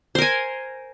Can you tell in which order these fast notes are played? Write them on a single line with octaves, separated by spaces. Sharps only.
C5 A#4 G#5